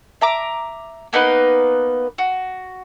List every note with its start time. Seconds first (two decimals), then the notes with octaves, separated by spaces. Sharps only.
0.21 E5 A#5 D6
1.13 A#3 B3 D#4 B4
2.18 F#4